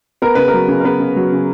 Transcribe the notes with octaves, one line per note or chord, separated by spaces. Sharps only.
B3 A#4
C#3 B4
A#4
F#3
C#3
A#4
B3 B4
C#3
F#3
C#3